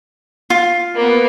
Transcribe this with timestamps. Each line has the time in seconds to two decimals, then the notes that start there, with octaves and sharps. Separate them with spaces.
0.50 F4
0.95 A#3 B3